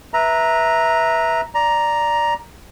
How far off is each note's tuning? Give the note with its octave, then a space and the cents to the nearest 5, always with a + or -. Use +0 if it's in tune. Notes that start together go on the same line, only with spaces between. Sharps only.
B4 -20 E5 -10 A#5 +0
D5 +0 A#5 +5